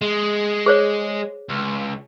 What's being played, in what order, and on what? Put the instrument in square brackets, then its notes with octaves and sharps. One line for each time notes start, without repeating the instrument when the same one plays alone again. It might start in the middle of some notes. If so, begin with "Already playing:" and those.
[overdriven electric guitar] G#3
[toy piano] G#4 C5 C#5
[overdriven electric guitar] C#2